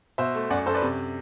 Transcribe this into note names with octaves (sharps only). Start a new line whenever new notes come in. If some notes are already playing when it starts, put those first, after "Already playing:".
B2 C5 E5
A3
F#2 D5 F#5
F#2 A4 C5
B4 D5
C3